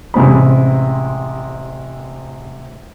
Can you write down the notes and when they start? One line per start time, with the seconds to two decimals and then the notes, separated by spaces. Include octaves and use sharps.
0.14 A1 C3 G#3 C4 B5